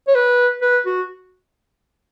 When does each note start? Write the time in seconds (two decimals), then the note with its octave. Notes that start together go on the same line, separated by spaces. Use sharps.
0.08 C#5
0.15 B4
0.61 B4
0.86 F#4